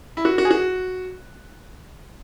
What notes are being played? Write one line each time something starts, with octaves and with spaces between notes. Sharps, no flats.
E4
F#4
F#4
G#4
F#4